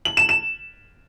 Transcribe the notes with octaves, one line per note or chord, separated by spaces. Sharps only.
F#7
E7
E7